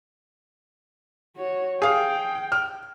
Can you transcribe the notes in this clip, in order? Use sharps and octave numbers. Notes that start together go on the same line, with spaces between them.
F#4 C#5
G#4 F5 G5
F6